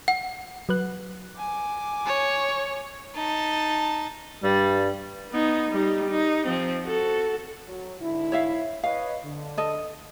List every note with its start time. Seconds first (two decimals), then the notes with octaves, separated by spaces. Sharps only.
0.08 F#5
0.69 F#3 B4 F#6
1.38 G#5 D6
2.07 C#5
3.15 D#4 A5
4.43 G2 G3
5.32 B3 D#4
5.71 G3 D#4
6.10 D#4
6.46 F3 C4
6.86 F#4 A4
7.67 F#3
8.02 G#2 D3 E4
8.32 C#5 E5 F5
8.83 B4 C#5 D#5 F5
9.24 D3
9.58 A4 D#5